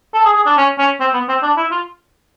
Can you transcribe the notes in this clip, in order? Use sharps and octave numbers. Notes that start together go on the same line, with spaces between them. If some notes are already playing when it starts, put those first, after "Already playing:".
A4
G#4
G#4
D4
C#4
C#4
C4
B3
C4
D4
E4
F4